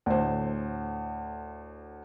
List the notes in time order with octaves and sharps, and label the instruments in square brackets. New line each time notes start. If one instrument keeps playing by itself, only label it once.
[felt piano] D2 A2 C5